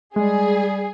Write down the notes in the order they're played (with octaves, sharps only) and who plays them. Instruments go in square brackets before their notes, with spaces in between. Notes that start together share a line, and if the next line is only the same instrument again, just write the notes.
[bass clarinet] G3 [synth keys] G#3 [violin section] G#4